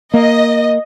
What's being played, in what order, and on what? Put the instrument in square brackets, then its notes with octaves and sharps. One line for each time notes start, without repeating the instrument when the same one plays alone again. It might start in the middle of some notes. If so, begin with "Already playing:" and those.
[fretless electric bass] A#3 [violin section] D#5